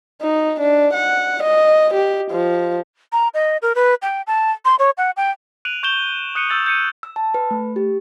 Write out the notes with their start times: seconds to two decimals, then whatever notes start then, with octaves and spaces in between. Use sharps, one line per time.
0.22 D#4
0.60 D4
0.94 F#5
1.43 D#5
1.94 G4
2.31 F3
3.12 A#5
3.34 D#5
3.62 A#4
3.75 B4
4.02 G5
4.27 A5
4.65 C6
4.79 C#5
4.98 F#5
5.17 G5
5.65 F#6 D7 D#7 F7 F#7
5.83 C#6 G6 E7 G7
6.35 D#6 F#6 C#7 D#7 G7
6.49 C#6 E6 G6 A6 F7 F#7
6.66 G6 C#7 D#7
7.03 E6
7.16 A5
7.34 B4
7.51 A3
7.76 G4